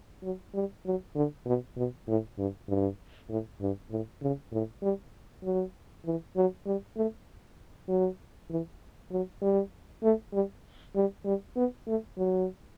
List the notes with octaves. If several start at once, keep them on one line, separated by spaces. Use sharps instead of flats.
F#3
G3
F#3
D3
B2
B2
A2
G2
G2
A2
G2
A2
C#3
A2
G3
F#3
E3
F#3
G3
A3
F#3
E3
F#3
G3
A3
G3
G3
G3
B3
A3
F#3